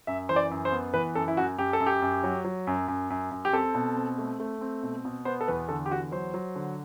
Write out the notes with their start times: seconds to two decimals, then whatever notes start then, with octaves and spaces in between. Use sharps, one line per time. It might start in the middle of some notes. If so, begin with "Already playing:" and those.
0.07 F#2 E5
0.29 E3 C5
0.36 D5
0.51 F#2
0.65 C5
0.72 B3
0.94 E3 B4
1.15 F#2 A4
1.28 E4
1.37 F#2 F#4
1.58 F#2 G4
1.73 A4
1.80 F#2
1.87 G4
2.02 F#2
2.23 F#3
2.45 F#3
2.67 F#2
2.88 F#2
3.10 F#2
3.31 F#2
3.45 G4
3.53 C4 A4
3.75 B2
3.96 C4
4.18 A3
4.40 A3
4.61 C4
4.83 B2
5.05 B2
5.25 B3 C5
5.41 A4
5.48 E2 B4
5.69 D3 A4
5.86 G4
5.91 E2 F#4
6.12 F#3 C5
6.34 F#3
6.56 D3